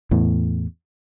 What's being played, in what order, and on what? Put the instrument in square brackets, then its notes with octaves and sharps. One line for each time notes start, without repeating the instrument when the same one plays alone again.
[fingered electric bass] E2 A2